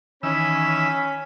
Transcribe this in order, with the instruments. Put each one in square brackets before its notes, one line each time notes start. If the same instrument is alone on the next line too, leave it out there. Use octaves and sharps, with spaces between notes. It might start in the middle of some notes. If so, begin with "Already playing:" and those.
[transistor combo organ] D#3 E3 E6 [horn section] C#4 [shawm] B5